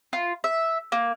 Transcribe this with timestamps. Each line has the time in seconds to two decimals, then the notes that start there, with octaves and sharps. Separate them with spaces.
0.13 F4
0.44 E5
0.92 A#3